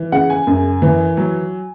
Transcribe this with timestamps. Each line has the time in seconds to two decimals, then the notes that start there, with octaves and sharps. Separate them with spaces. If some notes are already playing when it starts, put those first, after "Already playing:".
Already playing: E3
0.12 C#3 F#5
0.30 G#5
0.47 F#2
0.82 E3
1.17 F#3